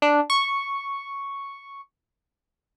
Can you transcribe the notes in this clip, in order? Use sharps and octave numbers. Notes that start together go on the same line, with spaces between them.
D4
C#6